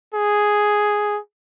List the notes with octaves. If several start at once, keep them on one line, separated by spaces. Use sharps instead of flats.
G#4